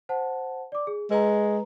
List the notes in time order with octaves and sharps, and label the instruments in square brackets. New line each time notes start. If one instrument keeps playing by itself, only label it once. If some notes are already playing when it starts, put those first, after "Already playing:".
[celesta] C5 F#5 A5
D5 D6
G#4
[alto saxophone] G#3 [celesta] B4 A#5